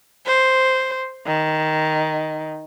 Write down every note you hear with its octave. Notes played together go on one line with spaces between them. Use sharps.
C5
D#3